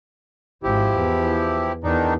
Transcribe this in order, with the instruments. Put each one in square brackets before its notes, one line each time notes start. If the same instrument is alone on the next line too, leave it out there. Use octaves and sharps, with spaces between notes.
[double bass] G#1 [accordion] F3 E4 G4
[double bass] E2
[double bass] E2 [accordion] D#3 D4 D#4